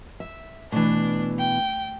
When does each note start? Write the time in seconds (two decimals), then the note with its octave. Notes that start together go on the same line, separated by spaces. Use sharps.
0.20 E5
0.72 B2 E3 A3 D4
1.39 G5